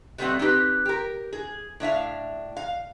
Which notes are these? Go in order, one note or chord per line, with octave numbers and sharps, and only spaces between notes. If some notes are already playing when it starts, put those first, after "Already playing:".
B2 G3 A3 B3 C4 F#5
C4 D#4 G4 B4
G4 A#4
G#4
A2 D4 E5 F5
F5